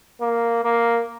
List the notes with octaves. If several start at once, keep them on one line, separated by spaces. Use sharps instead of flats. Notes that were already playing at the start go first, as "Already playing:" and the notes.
A#3
A#3